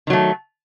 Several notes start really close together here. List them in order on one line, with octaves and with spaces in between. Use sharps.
D#3 F#3 A3